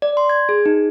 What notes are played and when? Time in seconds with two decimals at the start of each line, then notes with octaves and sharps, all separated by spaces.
0.02 D5
0.17 C6
0.30 G#6
0.49 G#4
0.66 D#4